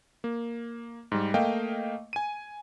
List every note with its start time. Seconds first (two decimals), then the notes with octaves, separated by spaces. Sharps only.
0.24 A#3
1.12 G#2 G3
1.34 A3 A#3 D#5 F5 G5
2.13 G#5 D#7